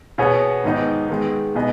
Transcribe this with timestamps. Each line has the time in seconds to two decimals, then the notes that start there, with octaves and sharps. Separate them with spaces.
0.18 B2 B3 G#4 C#5
0.64 G#2 D#3 B3 D#4
1.09 D#3 G#3 B3
1.55 B2 B3 G#4 D#5